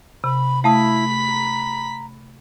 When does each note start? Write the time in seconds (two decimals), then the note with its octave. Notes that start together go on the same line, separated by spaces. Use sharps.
0.24 C3 B5
0.64 A3 E4 F5 A5 B5 D#6 B6
1.30 A#5